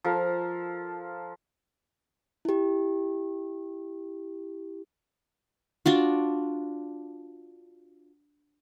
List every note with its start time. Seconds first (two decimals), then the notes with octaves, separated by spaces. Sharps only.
0.04 F3 A4 A#4
2.45 E4 G4
5.86 D4 F4 F#4